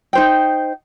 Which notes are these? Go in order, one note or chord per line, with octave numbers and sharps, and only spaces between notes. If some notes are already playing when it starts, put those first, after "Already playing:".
D#4 C5 G5